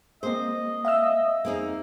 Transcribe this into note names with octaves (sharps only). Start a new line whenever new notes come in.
G#3 A#3 C4 C5 D#5
E5 F5 E6
F2 A#3 C4 D#4 G#4 A#4